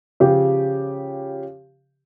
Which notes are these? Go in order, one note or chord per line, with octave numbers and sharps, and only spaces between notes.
C#3 F3 G4